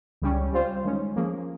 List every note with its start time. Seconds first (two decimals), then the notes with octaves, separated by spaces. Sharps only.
0.22 C#2 C#3 G3 C#4
0.52 G3 C4 F4 C5
0.84 D#3 G#3 C#4
1.16 F3 A#3 C#4 G#4